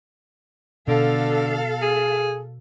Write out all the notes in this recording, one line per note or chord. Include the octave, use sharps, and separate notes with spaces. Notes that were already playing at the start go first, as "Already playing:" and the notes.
B2 D3 A4 F5
G#4